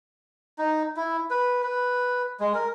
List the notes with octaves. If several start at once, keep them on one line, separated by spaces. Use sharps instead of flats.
D#4
E4
B4
B4
G#3
A#4